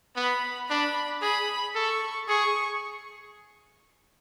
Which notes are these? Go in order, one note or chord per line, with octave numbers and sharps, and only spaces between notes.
B3 B5
D4 B5
G#4 B5
A4 C#6
G#4 C#6